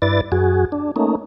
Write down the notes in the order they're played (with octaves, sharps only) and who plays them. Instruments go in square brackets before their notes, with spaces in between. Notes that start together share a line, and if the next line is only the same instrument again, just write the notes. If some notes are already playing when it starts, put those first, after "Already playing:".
[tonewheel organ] G2 E4 B4 D5 A6
F#2 F#4 G#4
D4
A3 A#3 C#4 D#4